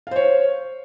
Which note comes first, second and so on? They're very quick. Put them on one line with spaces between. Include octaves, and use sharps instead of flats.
F5 C5 C#5